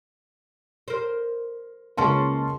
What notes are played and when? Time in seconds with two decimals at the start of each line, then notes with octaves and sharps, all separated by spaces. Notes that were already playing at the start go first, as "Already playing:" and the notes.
0.88 A#4 C5
1.97 C#2 A#3 C#4 B4 A5 C6